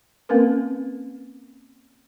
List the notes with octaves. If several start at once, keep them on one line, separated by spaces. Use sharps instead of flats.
A#3 C4 C#4 A#4 B4